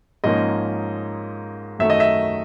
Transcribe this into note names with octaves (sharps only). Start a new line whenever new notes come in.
G#2 F3 A#3 C#4 D#5
F#2 D#3 F#3 A3 E5
D#5
E5